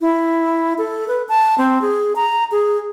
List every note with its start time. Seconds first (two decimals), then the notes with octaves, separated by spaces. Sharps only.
0.01 E4
0.78 A4
1.08 B4
1.29 A5
1.58 C4
1.82 G#4
2.16 A#5
2.51 G#4